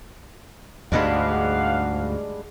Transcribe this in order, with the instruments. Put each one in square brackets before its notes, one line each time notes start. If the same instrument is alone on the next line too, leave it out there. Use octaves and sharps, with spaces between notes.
[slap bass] D2 G#2 [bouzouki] G3 G#3 D4 [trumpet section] F5 F#5